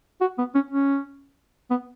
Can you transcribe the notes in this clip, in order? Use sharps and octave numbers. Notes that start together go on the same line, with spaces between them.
F#4
B3
C#4
C#4
B3